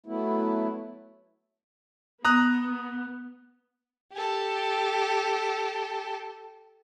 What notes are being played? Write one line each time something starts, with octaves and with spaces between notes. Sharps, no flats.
F#3 A3 B3 E4
B3 A#5 D#6 F#6
G4 A4